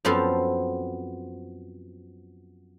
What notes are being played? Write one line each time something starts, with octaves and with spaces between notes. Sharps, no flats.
F#2 F3 B3 C4 A4 F5